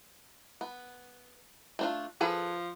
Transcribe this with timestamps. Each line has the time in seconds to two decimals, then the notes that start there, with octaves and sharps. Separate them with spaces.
0.61 B3
1.79 A3 D4 F4
2.21 F3 G#4 A4 B4